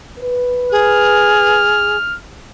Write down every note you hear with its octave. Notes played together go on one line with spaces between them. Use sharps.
B4
G#4 F6